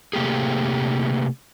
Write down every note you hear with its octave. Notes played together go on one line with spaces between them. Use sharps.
C3 A3 A#3 G4 G#4